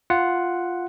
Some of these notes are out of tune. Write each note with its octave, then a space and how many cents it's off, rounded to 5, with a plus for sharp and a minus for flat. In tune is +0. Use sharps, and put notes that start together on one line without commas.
F4 +0 F#5 +0